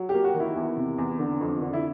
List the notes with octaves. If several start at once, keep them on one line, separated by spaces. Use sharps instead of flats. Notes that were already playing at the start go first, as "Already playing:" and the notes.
Already playing: F#3
G4
A#3
F#4
D#3
E4
E2
C3
E2
D3
F2
D3
E4